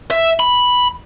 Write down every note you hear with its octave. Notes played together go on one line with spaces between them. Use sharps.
E5
B5